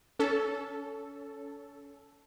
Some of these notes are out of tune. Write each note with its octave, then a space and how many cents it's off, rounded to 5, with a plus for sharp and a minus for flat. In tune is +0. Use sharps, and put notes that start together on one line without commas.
C#4 +25 A4 +0